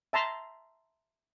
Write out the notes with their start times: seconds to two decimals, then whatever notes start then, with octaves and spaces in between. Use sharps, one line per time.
0.13 E5 A5 A#5 C6